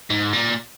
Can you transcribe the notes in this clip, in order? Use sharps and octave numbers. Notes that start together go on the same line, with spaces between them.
G#2
A#2